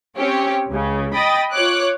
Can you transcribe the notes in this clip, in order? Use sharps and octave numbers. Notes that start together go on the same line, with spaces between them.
C4 C#4 G4 C#5
C#2 C#3
D#5 G5 B5 D#6 A6
F4 C#5 D6 F#6